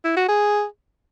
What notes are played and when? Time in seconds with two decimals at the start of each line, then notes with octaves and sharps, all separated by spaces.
0.05 E4
0.17 F#4
0.29 G#4